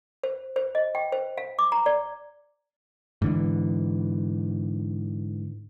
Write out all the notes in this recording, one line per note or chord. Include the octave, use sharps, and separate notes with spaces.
C5
C5
D#5
G5
C5
F5
D6
A#5
D5
G#2 D3 E3